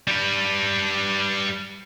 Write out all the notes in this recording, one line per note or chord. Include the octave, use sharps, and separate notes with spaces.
G3 B4